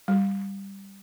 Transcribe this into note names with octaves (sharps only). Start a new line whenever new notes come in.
G3